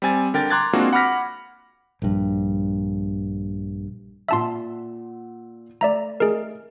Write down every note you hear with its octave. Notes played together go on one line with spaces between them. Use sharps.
G3 C4 G#5 A6
D3 A#4 G5 A6
A#5 C6 D6 F#6 G#6 A6
G#3 A#3 C4 D4 F4 F#4
F#5 B5 D6 F6 A#6 B6
A#1 G2
A#2 E5 F#5 A5 C6 E6
A3 D5 E5 A#5
A3 G#4 A#4 D#5